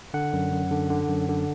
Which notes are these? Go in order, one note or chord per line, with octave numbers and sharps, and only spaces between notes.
D3 F#5
F#2
F#2
D3
D3
F#2
D3